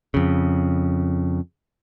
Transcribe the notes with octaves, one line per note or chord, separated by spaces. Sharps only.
F2 C#3